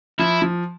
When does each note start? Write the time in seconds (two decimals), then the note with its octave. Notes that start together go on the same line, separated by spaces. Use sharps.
0.19 F3 E4
0.42 F3